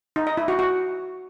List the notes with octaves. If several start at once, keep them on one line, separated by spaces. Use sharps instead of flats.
D#4
D#5
E4
F#4
F#4